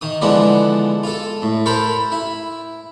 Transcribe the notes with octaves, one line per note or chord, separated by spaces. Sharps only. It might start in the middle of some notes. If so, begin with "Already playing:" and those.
D#3 D#6
D3 E3 F3 G#3 B3 D5
F4 A4
A2
A4 A#4 C5 A#5 B5
E4